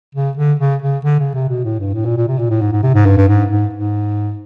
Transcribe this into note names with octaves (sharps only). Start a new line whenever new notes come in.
C#3
D3
C#3
C#3
D3
C#3
C3
B2
A2
G2
A2
A#2
A#2
C3
A#2
A2
G#2
G#2
C3
G#2
G2
G2
G#2
G#2
G#2